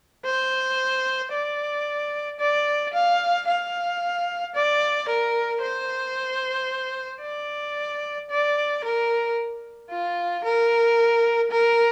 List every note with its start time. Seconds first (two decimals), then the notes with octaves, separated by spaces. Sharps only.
0.25 C5
1.32 D5
2.39 D5
2.94 F5
3.48 F5
4.55 D5
5.09 A#4
5.62 C5
7.22 D5
8.30 D5
8.84 A#4
9.91 F4
10.44 A#4
11.51 A#4